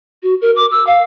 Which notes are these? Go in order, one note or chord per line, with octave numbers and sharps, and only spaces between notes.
F#4
A#4
D6
E6
F5